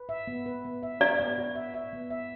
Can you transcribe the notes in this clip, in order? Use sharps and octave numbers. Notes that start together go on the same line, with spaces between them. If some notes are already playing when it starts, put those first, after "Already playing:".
Already playing: B4
E5
B3
B4
B3
E5
F#4 D5
B3
F#4
E5
E5
B3
E5